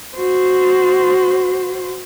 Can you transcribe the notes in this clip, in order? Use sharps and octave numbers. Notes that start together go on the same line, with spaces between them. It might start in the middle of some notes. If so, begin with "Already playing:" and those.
F#4 C5